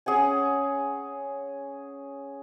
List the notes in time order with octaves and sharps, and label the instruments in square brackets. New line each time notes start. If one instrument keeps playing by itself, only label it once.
[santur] C#4 G#4 F#5 G#5